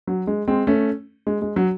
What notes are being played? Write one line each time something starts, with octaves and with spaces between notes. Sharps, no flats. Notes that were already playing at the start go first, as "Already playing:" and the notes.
F#3
G#3
G#3 C4
A3 C#4
G#3
G#3
F#3